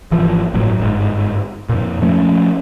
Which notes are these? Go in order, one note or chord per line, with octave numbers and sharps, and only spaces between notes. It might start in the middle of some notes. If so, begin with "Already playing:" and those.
G#1 E3 F3
G1 A2 F#3
G1 G#2
F2 A#2
F3 A3 C#4